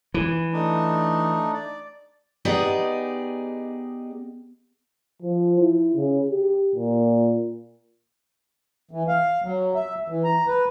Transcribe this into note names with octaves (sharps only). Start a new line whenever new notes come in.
E3
A3 D4 D#4
D5
B3 D#4 G4 G#4 D5 D#5
F3
E4
C#3
G4
A#2
E3
F5
F#3
E5
E3
A#5
B4